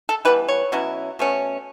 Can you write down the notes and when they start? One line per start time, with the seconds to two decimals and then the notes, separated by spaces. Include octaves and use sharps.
0.09 A4
0.25 E3 G3 B3 B4
0.48 C#5
0.72 B2 F#3 C#4 E4
1.19 B2 A3 C#4